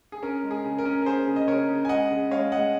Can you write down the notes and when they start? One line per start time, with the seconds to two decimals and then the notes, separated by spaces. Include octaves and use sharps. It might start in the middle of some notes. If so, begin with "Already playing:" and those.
0.12 G#4
0.22 C#4 A#4
0.43 G#3
0.51 G#4
0.64 C#3
0.78 A#4
0.85 C#4
1.02 A#4
1.06 C#4 G#4 C5
1.27 C#3
1.36 D#5
1.48 C#3 A#4 C#5
1.69 C#3
1.85 G#5
1.89 G#3 D#5 F#5
2.11 C#3
2.31 G#3 C#5 F5
2.52 G#3 D#5 F#5